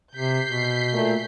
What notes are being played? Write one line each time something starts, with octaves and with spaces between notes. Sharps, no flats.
C3 G6 B6 C7
B2
A#2 A3